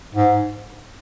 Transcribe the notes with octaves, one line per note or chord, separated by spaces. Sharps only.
G#2